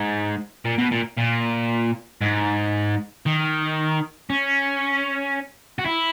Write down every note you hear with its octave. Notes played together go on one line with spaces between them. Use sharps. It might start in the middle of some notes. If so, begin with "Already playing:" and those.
Already playing: G#2
A#2
B2
A#2
A#2
G#2
D#3
C#4
F#4
E4